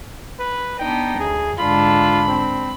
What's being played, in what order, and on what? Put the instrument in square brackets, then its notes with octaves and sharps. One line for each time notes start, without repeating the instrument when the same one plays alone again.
[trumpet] B4
[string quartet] B3 D4 D#4 [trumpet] G5
[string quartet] D2 [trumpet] G#4
[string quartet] G#2 D3 D4 [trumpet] F4 [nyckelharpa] B5
[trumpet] C4